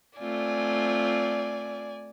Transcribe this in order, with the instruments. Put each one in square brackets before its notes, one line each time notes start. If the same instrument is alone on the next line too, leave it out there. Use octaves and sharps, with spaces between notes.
[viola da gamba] A3 C4 F4 [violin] D5 G#5